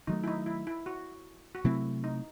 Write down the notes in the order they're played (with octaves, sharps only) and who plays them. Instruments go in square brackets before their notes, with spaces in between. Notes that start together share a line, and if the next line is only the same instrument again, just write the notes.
[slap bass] D#3 F#3 A3 [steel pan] D#4
[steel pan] E4
D#4
E4
E4
F#4
F#4
[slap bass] C3 F#3 A3 C4 [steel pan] E4
[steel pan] D#4